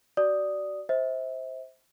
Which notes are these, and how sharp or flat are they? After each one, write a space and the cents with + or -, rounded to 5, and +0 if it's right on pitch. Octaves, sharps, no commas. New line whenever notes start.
F#4 +30 D5 +0 D#6 +0
C5 +0 E5 -30